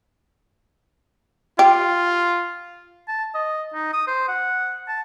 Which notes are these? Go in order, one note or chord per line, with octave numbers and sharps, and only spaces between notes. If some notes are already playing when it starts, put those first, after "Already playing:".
F4 G4
A5
D#5
D#4
D#6
C5
F#5
A5